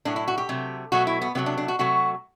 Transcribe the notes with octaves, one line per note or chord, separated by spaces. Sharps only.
A2 F#3 A3 D4
E4
F#4
G4
C3 F#3 A3
B2 F#3 A3 F#4
E4
B3
C3 F#3 A3 B3
D4
D4
F#4
C3 F#3 A3 F#4